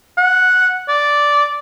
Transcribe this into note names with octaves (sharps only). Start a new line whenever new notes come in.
F#5
D5